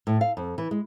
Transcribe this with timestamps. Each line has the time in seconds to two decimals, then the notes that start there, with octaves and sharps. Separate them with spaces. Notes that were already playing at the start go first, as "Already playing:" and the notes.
0.07 A2
0.21 F5
0.37 F2
0.58 E3
0.71 G#3